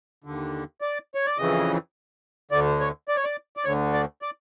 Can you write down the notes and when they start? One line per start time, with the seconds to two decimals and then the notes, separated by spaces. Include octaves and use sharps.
0.24 D#2 D3
0.81 D5
1.15 C#5
1.26 D5
1.38 F2 C#3 E3 D#5
2.51 D2 D3 D5
2.80 C#5
3.08 D5
3.17 C#5
3.24 D5
3.57 D5
3.65 D2 D3 C#5
3.93 D5
4.22 D5